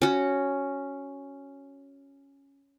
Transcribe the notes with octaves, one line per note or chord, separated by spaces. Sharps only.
C#4 F#4